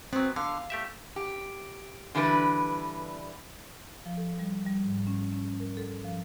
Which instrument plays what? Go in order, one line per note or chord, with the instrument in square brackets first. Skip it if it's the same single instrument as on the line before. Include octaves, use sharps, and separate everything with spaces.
[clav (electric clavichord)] F#3 B3 [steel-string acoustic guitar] C4
[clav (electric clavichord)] D3 [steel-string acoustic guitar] F5
[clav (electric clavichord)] A3 G4 E5
[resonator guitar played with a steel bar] G4
D3 E3 G3 D4 B4
[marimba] F3
A4
G3
G3
G#2
C#4
C#4
A#4
A4
F3